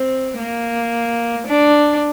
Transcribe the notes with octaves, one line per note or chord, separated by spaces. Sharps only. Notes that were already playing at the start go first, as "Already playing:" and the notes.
Already playing: C4
A#3
D4